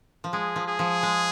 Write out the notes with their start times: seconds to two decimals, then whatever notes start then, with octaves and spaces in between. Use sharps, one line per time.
0.24 F3
0.33 G#3 G#4
0.56 F3
0.68 G#4
0.79 F3
1.03 G#3